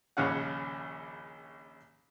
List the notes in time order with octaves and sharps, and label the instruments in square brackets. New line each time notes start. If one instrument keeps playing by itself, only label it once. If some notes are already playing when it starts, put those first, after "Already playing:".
[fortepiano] A#1 D#2 C#3 C#4 F5 F#5